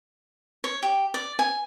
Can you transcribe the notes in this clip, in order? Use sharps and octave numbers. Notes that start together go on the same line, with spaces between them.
C#5
G4
D5
G#5